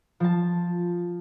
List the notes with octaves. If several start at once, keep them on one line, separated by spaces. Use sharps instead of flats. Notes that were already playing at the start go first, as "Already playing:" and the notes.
F3 A5